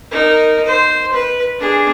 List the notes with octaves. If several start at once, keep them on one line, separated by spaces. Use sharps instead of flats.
D#4 A#4
C5
B4
D4 G#4